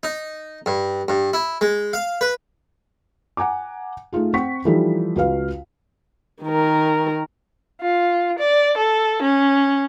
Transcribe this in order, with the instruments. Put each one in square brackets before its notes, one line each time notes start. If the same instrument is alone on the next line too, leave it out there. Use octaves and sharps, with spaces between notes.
[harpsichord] D#4
G2
G2
E4
G#3
F5
B4
[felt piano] F#5 G#5 A#5 D6
A3 D#4 F4 G#4
C4 F#5 G5 C#6 B6
E3 F3 G3 D#4 A4
C#2 F#4 B4 F5
[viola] D#3 A#4
[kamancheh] F4
D5
A4
C#4